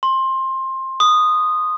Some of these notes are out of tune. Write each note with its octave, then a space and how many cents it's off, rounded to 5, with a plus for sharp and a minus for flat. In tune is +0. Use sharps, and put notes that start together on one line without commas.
C6 +20
D#6 -10